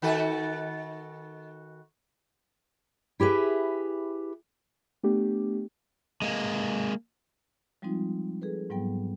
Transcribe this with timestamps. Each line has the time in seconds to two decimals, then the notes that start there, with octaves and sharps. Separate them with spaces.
0.02 D#3 F#4 A4
3.20 E4 G4 G#4 B4 E5
5.04 A3 B3 D4 G4
6.22 G#3 A#3
7.82 F3 G3 G#3 C4 D#4 F4
8.42 G#4 A4 B4
8.70 G#2 F#3 G3 B3 G5